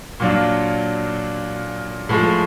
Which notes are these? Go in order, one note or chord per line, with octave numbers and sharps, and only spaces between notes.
A#2 F#3 A#3 D4 F4
A2 F3 G#3